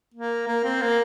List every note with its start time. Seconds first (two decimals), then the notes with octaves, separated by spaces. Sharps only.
0.14 A#3
0.47 A#3
0.64 C4
0.82 A#3